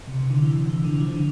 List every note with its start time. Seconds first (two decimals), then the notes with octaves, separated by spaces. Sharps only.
0.08 C3
0.19 C3
0.30 D3
0.42 E3
0.69 E3
0.84 D3
1.00 F3
1.13 D3